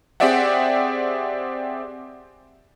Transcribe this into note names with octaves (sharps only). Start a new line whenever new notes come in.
C4 G4 G#4 D5 E5 F#5